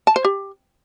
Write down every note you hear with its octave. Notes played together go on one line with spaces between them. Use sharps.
A5
C5
G4